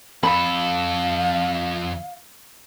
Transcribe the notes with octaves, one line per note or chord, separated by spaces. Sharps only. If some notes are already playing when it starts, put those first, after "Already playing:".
F2 A4 F5 B5